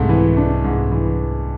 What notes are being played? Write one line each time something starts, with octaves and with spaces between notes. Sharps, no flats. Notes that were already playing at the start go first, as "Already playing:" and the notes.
Already playing: C2 G#2 C3 A3
E3
D4
G#2
E3